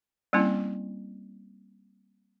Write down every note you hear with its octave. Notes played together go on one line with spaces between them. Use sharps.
G3 A#3 C4 C#4 E4